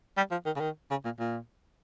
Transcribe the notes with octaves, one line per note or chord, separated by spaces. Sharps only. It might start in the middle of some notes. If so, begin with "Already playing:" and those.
G3
F3
D#3
C#3
D#3
C#3
A#2
A#2